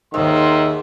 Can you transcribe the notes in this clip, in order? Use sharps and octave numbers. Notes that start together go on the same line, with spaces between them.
D#2 G#2 D#3 E5 C6 D#6 E6